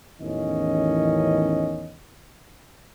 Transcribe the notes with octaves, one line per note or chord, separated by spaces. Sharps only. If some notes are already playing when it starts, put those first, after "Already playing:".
A1 E2 D#3 C#4 D#5